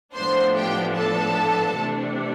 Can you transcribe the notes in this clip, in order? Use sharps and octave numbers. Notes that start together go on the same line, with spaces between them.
A2 F3 B3 D4 C5 C6
G4 G5
A4 A5
C3 E3 A3 D4